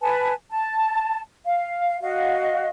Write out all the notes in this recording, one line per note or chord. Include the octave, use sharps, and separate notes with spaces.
B4 G#5 A5
A5
F5
F#4 D#5 F5